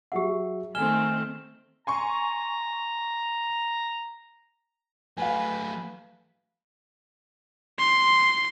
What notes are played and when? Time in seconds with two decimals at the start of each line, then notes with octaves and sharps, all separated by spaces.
0.12 F#3 G4 G#4 E5 F#5
0.75 D#3 A3 C4 G#5 F6 E7 G7
1.87 G#5 A#5 C6 C#6
5.18 F#3 A3 B4 F5 G#5
7.79 C6